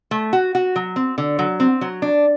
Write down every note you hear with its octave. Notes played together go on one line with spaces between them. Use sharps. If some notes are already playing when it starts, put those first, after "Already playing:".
A3
F#4
F#4
F#3
C4
D3
F#3
C4
F#3
D4